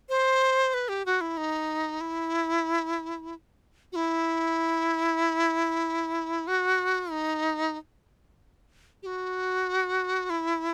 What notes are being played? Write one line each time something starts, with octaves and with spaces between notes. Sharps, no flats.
C5
B4
G4
F#4
E4
D#4
E4
F#4
E4
F#4
D#4
G4
F#4
E4